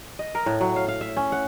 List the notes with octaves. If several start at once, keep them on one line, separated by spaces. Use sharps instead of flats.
D#5
A#4
A2
F#3
F5
F5
E5
C#4
F#5